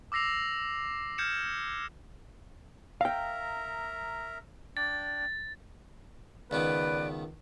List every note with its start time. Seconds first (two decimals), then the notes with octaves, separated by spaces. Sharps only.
0.12 D6 E6 A#6 C7 F7
1.18 F6 G6 G#6 C#7 E7
3.01 A#4 E5 F5 G5 A#5
4.77 D4 D5 G5 A6
6.51 C#2 D#3 B3 B4 D5